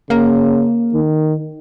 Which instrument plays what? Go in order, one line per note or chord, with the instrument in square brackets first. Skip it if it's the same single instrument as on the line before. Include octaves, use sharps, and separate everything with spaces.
[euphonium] C#3 [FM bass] A#3
[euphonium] D#3